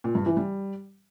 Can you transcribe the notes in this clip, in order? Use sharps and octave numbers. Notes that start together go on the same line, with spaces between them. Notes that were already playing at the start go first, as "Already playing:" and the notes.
A#2
G2
E3
G3